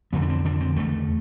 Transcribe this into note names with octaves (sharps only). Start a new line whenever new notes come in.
F2 D3 B3
D4
C4
F2 D3 D4
C4
E2 D3 A3